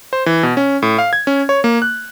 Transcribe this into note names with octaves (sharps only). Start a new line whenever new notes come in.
C5
E3
B2
C#4
A2
F5
G#6
C#4
C#5
A#3
F#6